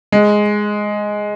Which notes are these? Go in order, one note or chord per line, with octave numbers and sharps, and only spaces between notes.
G#3